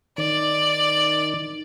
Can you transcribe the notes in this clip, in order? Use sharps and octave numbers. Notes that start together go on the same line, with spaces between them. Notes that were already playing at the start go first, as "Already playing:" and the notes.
D#3 D5